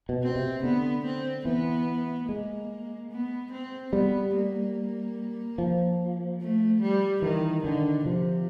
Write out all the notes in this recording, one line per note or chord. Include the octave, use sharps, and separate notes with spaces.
B2
C4
C3
D3 B3
C4
E3 B3
G#3 A#3
B3
C4
G3 B3
A#3
F3
A3
G3
D#3 E3
D3 D#3
C3 F3